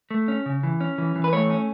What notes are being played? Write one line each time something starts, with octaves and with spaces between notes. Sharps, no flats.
A3
C#4
C#3
E3
C#4
E3
E3
B4
A3 C#5
C#4